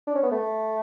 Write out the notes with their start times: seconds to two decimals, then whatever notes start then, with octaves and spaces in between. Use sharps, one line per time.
0.07 D4
0.15 C#4
0.23 B3
0.32 A3